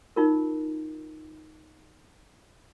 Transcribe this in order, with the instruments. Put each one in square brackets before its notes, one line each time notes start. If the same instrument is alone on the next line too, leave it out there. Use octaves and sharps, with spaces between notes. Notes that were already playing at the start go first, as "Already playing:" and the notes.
[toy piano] D#4 F4 A#4